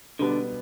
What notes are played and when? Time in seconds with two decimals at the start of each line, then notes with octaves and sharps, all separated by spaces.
0.19 B2 D3 G3 B3